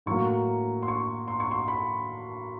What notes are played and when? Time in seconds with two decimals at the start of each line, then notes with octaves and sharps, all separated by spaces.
0.06 A2 F#3 A#3 C#6
0.82 C6
0.88 C#6
1.28 C6
1.40 C#6
1.51 C6
1.68 B5